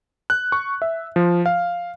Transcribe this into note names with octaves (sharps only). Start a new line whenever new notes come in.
F#6
C#6
E5
F3
F5